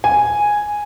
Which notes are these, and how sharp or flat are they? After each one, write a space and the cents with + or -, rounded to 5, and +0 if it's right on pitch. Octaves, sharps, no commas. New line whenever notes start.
G#5 -5